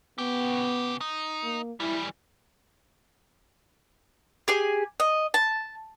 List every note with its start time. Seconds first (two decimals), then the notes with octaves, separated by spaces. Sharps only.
0.18 C#3 B3 G4
1.01 D#4
1.43 A#3
1.80 E3 G3 E4
4.48 G4 G#4 G#5
5.00 D#5
5.34 A5